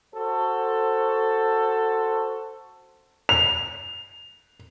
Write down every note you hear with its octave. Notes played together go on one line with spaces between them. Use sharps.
F#4 A4 C5
F7